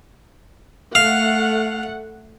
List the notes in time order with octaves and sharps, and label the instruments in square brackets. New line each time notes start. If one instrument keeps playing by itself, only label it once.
[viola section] A3 F#5 [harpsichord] F5